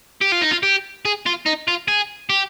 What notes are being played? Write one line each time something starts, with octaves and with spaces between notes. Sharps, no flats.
G4
F4
D#4
F4
G4
G#4
F4
D#4
F4
G#4
G4